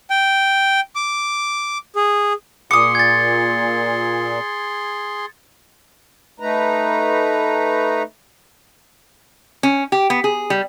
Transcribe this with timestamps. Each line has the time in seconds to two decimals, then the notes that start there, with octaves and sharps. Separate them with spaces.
0.10 G5
0.96 D6
1.96 G#4
2.71 A#2 G#4 C6 D6 D#6 C#7
2.95 G#6 A6
6.40 A3 D#4 B4 A#5
9.63 C#4
9.92 G4
10.10 B3
10.24 G#4
10.50 G3